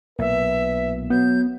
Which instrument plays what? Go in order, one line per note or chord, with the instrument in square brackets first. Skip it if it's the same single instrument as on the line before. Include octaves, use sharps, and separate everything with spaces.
[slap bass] B1 [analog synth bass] A#2 [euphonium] B4 [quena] E5
[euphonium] F#3 [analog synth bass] B3 [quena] G6